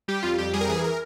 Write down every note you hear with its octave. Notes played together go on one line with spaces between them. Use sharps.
G3 G4
F2 F4
F2 G4
G3 G#4
A#4
E3 G#4
A#4